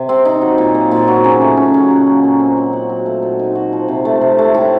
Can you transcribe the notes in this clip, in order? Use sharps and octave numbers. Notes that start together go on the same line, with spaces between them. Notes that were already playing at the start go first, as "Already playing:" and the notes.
Already playing: C3
C4
D#4
F#3
A#2
A#3
A#2
F#3
C#3
A3
C#4
F#3
A#2
A#3
A#2
C4
F#3
F#4
F#3
A3
A#2
D#4
F#4
F3
C3
A3
C3
A3
A2